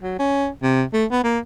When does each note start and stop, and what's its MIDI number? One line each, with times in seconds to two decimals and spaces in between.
0.02 0.16 54
0.19 0.48 61
0.63 0.83 48
0.93 1.05 57
1.11 1.22 59
1.24 1.39 58